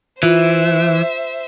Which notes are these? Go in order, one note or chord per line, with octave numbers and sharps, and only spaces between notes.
E3 F4 C5 E5